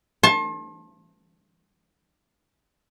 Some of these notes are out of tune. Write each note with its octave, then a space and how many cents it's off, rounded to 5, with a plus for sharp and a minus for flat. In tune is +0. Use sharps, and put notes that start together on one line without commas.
A5 +0 C6 +40